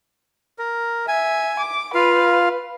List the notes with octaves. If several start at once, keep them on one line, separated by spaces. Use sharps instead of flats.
A#4
E5 G#5
D6
F4 B4 F5